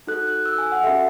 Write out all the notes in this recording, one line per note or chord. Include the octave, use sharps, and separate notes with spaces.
D#4 F#4 A4 F#6
F#6
E6
G#5
F#5
C#4 F#4 A4 E5